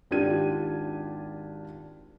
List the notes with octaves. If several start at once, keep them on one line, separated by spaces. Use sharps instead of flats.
G#1 D4 F4 G4 G#6 D#7